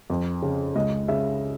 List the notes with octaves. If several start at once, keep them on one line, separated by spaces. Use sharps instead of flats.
F2
C#3
C#2 D#5
C#3 E5